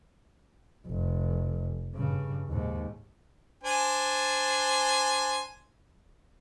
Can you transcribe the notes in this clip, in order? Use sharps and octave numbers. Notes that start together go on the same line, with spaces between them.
F1
G2 C#3
D#2 G#2
D4 C5 G#5